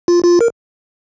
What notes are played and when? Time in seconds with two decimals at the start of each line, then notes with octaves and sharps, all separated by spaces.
0.08 F4
0.24 F4
0.41 A#4